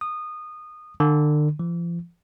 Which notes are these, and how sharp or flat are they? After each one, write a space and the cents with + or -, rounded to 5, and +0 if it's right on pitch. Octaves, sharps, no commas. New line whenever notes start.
D#6 -20
D3 +35
F3 -40